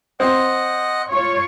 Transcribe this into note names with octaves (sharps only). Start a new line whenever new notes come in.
C4 D#5 F#5
F4 C#5